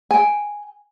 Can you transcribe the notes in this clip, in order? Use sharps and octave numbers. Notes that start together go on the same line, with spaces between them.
G5 G#5